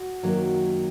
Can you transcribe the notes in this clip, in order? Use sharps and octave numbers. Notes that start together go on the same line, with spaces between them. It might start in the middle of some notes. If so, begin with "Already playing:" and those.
Already playing: F#4
F#2 D#3 F#3 A#3